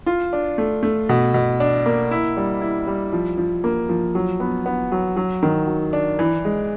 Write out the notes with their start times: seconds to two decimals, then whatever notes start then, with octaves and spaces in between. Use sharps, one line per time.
0.06 F4
0.33 D4
0.58 A3
0.83 A3
1.09 B2
1.34 B2
1.60 D4
1.86 A#3
2.11 E4
2.37 G3
2.61 E4
2.87 G3
3.13 F3
3.38 F3
3.64 A#3
3.89 F3
4.15 F#3
4.40 B3
4.66 B3
4.92 F#3
5.17 F#3
5.43 D#3
5.67 F#3
5.93 D4
6.19 E3
6.45 G#3